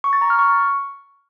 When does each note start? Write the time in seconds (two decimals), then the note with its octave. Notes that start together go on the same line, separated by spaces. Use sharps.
0.04 C#6
0.13 A6
0.21 A#5
0.30 F6
0.39 C#6